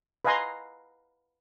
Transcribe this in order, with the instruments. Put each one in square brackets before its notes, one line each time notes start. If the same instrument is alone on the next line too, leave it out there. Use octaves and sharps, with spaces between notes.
[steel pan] B4 D#5 F5 G#5 A#5 C6